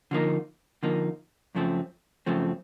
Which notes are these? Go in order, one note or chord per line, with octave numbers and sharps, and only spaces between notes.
D3 F3 A#3 D#4
D3 F3 A#3 D#4
F#2 C#3 F3 A3 C4
F#2 C#3 F3 A3 C4